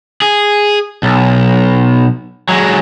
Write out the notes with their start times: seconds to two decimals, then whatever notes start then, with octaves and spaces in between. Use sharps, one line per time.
0.22 G#4
1.03 B1
2.49 F#3 G#3